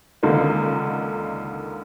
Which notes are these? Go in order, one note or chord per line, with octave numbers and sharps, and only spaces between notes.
C#2 D3 D#3 A#3